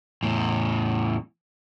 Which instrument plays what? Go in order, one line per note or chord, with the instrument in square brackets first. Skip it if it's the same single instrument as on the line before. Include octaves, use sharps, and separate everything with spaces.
[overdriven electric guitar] E2 A2